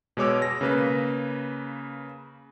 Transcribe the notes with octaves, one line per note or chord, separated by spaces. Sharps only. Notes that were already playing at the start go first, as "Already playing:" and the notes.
B2 G#3 C#5 D6 E6
A#6
C#3 A#3 B4